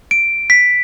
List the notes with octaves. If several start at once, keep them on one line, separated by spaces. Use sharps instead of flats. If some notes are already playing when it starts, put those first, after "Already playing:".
D7
B6